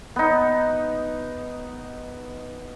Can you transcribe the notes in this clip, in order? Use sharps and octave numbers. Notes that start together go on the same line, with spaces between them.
B3 D#4